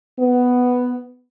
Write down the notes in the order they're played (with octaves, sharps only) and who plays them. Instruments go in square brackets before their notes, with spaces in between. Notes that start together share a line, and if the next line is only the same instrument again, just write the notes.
[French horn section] B3